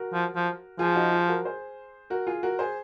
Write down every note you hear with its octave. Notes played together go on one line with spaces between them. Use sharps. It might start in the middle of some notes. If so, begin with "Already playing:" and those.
Already playing: F#4 A#4
F3
F3
F3 F4 G#4
D#4 F#4
F4 G#4
F#4 A#4
G#4 C5
F#4 A#4
F4 G#4
F#4 A#4
G#4 C5